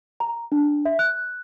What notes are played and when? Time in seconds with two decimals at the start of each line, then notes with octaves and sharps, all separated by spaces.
0.20 A#5
0.52 D4
0.85 E5
0.99 F#6